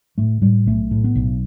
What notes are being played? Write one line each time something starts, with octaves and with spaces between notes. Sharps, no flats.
A2 A3
A2 G3
B1 A3
A2
B3
B1